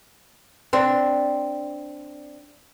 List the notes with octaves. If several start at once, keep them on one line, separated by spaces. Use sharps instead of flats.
C4 D4